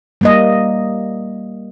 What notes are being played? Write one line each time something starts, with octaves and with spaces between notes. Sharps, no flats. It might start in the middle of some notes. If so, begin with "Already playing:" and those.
G3 A#3 D#5